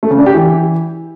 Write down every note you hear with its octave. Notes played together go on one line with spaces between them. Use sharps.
A3
C#3
D4
G4
E3